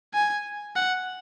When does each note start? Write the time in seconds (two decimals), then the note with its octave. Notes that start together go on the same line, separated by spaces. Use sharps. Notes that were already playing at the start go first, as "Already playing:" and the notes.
0.14 G#5
0.76 F#5